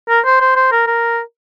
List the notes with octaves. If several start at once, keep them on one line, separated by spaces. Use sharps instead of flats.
A#4
C5
C5
C5
A#4
A#4